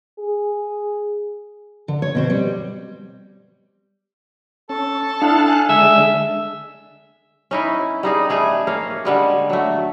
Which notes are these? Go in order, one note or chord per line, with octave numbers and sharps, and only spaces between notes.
G#4
D3
C#5
B2 C4 C5
G3
C#4 A4
D4 E4 F5 F#5
F5 G#5 F#6
D3 G#3 E5
C#4 D#4 E4
G3 D#4 G#4
G3 A3 G#4
A#3 C#4 F5
D3 G3 G#3
F#3 A3